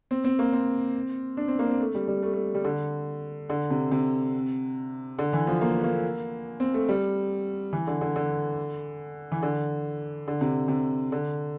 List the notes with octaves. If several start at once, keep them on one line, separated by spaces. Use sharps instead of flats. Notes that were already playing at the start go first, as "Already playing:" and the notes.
C4
C4
A#3
C4
D4
C4
A#3
C4
A3
G3
G3
A3
A3
G3
D3
D3
C3
C3
D3
E3
F3
A#3
A3
A#3
C4
A3
G3
E3
D3
D3
D3
E3
D3
D3
C3
C3
D3